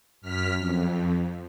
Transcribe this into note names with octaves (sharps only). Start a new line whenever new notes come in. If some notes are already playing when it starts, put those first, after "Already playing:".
F#2 F6 B6
F2